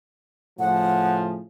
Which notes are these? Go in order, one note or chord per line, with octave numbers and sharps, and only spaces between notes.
A2 C#3 F3 F#5